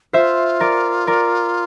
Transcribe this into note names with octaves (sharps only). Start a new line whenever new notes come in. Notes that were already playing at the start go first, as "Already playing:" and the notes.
F4 C5 E5
A#4 D5
A#4 D5